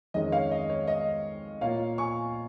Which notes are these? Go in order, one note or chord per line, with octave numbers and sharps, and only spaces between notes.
F2 D#3 G#3 C#4 D#5
C#5 F5
D#5
C#5
D#5
A#2 A#3 F4 C#5 F5
G#5 C#6